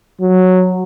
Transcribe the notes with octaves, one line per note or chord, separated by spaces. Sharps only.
F#3